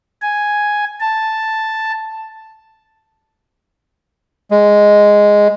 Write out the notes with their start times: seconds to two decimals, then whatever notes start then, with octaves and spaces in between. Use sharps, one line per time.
0.22 G#5
1.00 A5
4.51 G#3